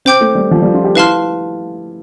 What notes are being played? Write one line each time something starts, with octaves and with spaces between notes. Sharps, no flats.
C4 C5 G5 D6 G6
A3
G3
F3
G3
F4
G4
E4 B4 F5 A5 C6 F6